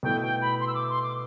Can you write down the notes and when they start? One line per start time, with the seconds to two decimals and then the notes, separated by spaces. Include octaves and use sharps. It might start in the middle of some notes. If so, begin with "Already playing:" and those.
0.03 B2 A3 E4 G5
0.22 G5
0.41 B5
0.60 C6
0.67 E6
0.75 D6
0.89 C6
1.03 D6